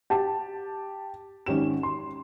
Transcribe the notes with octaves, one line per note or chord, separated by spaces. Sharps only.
G4 A5
G#1 C#4 G4 E7
C6